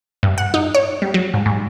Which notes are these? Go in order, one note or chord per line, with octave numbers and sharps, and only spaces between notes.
G2
F#5
D#4
C#5
G3
F#3
G#2
G#2